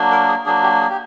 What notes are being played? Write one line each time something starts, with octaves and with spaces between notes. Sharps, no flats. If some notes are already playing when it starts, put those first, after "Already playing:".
Already playing: F#3 A#3 D4
A#4
G#4
F#3 A#3 D4 G#4
G4
G#4
G4